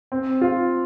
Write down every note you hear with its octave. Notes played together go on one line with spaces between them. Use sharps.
C4
F4